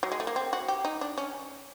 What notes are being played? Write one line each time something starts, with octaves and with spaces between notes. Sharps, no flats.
F#3
G#3
A3
A#3
C4
F#4
G4
D#4
D4
C#4